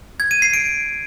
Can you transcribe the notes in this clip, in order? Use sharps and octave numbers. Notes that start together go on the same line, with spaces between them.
G#6
D#7
C7
D7